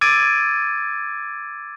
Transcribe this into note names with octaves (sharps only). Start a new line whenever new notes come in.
D6 E6 G#6 A6 D7 D#7